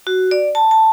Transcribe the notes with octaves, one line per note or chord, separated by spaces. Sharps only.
F#4
D5
A5
A5